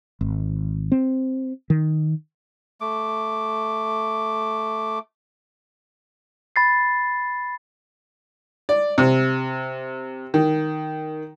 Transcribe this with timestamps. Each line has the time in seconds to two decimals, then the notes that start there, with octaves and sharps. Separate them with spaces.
0.21 G#1
0.92 C4
1.70 D#3
2.81 A3 D6
6.56 B5 A6 C7
8.69 D5
8.98 C3
10.34 D#3